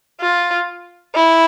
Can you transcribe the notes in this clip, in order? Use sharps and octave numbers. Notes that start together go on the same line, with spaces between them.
F4
E4